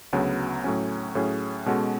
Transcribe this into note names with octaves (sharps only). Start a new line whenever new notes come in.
D2 C#3 F#3 B3
A2 F#3 C#4
A2 F#3 C#4 G#4
B2 G#3 C#4 F#4 A4